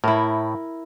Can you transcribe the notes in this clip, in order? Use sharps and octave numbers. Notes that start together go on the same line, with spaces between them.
A2 E4 A#4